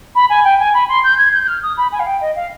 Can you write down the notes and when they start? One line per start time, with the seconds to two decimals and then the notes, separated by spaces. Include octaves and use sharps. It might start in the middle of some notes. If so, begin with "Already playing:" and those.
0.15 B5
0.30 G#5
0.44 G5
0.59 G#5
0.74 B5
0.89 C6
1.04 G6
1.18 G#6
1.33 G6
1.43 G6
1.48 F6
1.62 D#6
1.77 B5
1.92 G#5
2.00 F5
2.07 G5
2.21 D#5
2.36 F5